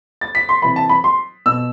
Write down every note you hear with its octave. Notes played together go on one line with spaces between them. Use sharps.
A6
B6
C6
C3 E3 B5
A5
B5
C6
B2 E6